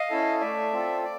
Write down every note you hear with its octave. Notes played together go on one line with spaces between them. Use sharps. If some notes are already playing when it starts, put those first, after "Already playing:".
Already playing: D#5 F5
C#4 E4 A4
A3 D5 E5
C4 F4 A4
D5